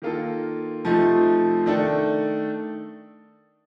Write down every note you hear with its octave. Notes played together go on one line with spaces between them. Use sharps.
D#3 A#3 F4 A4
C3 F3 A3 D#4
D#3 A3 D4 A4